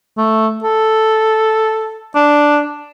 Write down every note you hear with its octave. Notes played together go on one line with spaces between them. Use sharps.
A3
A4
D4